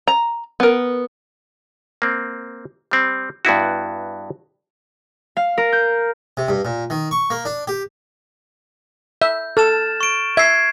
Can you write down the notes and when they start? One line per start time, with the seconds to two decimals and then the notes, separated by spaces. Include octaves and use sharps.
0.08 A#5
0.60 B3 A#4
2.02 A#3 C4
2.91 G3 C4
3.45 G2 B3 E4 F#4
5.37 F5
5.58 A#4
5.72 G6
6.37 C3
6.49 G2
6.65 A#2
6.90 D#3
7.11 C#6
7.30 A#3
7.45 D4
7.67 G4
9.22 E5 G6
9.57 A4 F6 A6 E7
10.01 C#6 D7
10.37 E5 G#6 C7